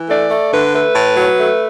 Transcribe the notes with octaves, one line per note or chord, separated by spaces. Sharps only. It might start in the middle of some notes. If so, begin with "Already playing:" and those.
Already playing: E3
A3 D5
A3
D3 B4
A3 B4
A2
F#3
A3